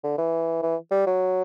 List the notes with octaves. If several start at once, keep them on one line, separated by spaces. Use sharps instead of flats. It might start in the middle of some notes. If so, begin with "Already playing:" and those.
D3
E3
E3
G3
F#3